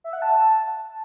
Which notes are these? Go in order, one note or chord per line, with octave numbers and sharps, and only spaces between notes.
E5
F#5
A5